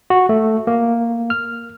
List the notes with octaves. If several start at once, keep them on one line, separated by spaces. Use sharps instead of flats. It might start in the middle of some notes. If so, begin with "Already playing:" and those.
F#4
A3
A#3
F6